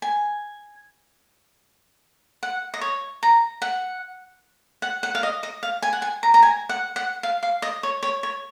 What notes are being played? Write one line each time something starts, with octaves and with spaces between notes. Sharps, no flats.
G#5
F#5
D#5
C#5
A#5
F#5
F#5
F#5
F5
D#5
D#5
F5
G#5
F#5
G#5
A#5
A#5
G#5
F#5
F#5
F5
F5
D#5
C#5
C#5
C#5